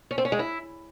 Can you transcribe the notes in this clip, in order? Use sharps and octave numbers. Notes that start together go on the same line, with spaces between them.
C#4
C4
C#4
G#3
E4